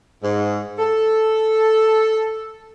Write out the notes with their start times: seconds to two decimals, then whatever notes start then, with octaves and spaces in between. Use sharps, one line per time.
0.23 G#2
0.78 A4